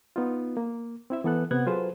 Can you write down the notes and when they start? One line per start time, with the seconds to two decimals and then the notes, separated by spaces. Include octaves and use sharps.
0.16 B3 D#4 F4
0.57 A#3
1.10 C4 E4 E5
1.24 E3 B3 A4 F#6
1.51 C3 B3 F#5 F#6 G#6
1.66 F#3 F4 G#4 A4 B4 C5